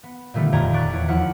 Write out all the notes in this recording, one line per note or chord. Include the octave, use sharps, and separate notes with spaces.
B3
A#2 D3 D#3 G3 A3 B3
D#1 F2 D5 G5 A#5 G#6
C#6 D6 F#6 A6 D7
E2 C#5
D#2 F3 E4 F#5